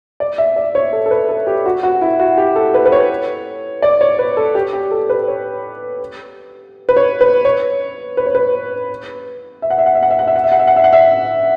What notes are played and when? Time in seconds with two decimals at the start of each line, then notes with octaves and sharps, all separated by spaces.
0.20 D5
0.38 E5
0.56 D5
0.75 C#5
0.93 A4
1.06 A4
1.11 B4
1.29 A4
1.47 G4
1.66 F#4
1.83 F#4
2.01 E4
2.19 F#4
2.38 G4
2.56 A4
2.74 B4
2.86 B4
2.92 C#5
3.82 D5
4.01 C#5
4.19 B4
4.37 A4
4.55 G4
4.73 G4
4.91 A4
5.10 B4
5.28 C#5
6.89 B4
6.97 C#5
7.21 B4
7.45 C#5
8.17 B4
8.26 C#5
8.35 B4
9.62 E5
9.70 F#5
9.78 E5
9.86 F#5
9.95 E5
10.03 F#5
10.11 E5
10.19 F#5
10.27 E5
10.36 F#5
10.44 E5
10.52 F#5
10.59 E5
10.67 F#5
10.76 E5
10.84 F#5
10.93 E5